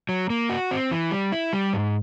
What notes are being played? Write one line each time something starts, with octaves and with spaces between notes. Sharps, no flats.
F#3
A#3
F#4
C4
E3
G3
E4
G3
G#2